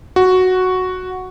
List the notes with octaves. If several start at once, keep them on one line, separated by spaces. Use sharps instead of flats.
F#4